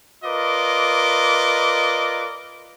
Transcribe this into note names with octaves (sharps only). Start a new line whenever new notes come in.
F4 A#4 B4 D5 D#5 D6